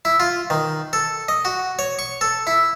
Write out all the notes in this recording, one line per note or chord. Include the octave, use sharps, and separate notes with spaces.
E4
F4
D#3
A4
D#5
F#4
C#5
C#6
A4
E4